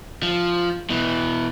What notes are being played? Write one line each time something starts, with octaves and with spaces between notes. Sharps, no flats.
F3
B2 E3